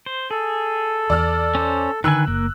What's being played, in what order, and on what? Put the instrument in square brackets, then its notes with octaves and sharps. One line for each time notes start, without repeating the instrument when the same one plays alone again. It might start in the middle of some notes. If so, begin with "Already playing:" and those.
[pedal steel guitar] C5
[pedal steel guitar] G#4 [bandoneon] A4
[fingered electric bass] E2 [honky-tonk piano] D5 E6 F6
[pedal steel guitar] C#4 C5
[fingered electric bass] D3 [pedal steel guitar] D#3 B4 G#5 [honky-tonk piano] E6 F#6
[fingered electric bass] F#1 [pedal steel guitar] A#3